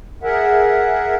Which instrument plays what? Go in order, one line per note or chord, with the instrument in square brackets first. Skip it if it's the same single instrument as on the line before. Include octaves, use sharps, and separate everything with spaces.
[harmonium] G#4 A#4 E5 F#5